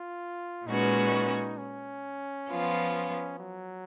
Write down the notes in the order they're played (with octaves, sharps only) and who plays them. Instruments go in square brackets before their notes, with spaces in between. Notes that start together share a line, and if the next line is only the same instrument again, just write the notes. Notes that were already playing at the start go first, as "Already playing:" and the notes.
Already playing: [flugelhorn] F4
[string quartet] A#2 G#3 C#4 F#4 B4 [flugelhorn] D#4
[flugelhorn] C#4
[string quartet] F3 B3 F4
[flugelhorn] F#3